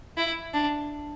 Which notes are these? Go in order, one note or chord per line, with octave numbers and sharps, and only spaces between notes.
E4
D4